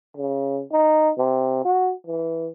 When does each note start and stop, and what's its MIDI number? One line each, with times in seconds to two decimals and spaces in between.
0.17 0.62 49
0.72 1.10 63
1.18 1.60 48
1.65 1.92 66
2.07 2.49 52